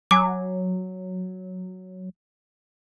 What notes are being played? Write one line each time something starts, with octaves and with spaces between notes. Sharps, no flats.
F#3 G#5 D6